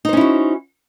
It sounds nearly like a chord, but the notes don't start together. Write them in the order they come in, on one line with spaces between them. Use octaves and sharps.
D#4 C5 C#4 E4 F#4